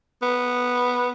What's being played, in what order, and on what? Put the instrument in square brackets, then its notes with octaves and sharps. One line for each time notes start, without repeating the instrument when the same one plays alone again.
[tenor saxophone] B3